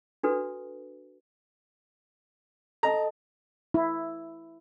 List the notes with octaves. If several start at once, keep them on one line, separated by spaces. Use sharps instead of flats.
D4 F#4 A4 B4
A4 D#5 A5 A#5
E4